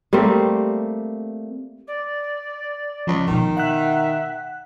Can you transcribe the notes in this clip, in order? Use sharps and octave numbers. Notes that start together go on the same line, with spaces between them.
G3 A3 A#3 C4
D5
C#2 F3
B2 D#3 D#4
E5 F#5 F#6